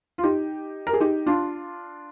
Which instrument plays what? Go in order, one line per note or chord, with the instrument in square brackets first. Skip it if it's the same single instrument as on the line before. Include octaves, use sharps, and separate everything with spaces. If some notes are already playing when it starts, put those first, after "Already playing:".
[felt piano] F4
D#4 G4
A#4
G#4
D#4 G4
D4 F4